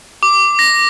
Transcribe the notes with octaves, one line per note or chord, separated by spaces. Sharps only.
D6
A#6